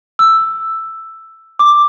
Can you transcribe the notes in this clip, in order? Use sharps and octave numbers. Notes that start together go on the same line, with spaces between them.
E6
D6